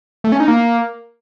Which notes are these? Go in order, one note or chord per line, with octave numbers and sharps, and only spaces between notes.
A3
C#4
D#4
A#3